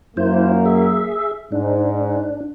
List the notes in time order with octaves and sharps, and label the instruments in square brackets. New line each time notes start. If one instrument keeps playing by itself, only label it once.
[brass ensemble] F#2 A#3 [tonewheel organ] E4 C5
[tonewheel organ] G#4 E5
[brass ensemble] G#2 [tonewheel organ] D4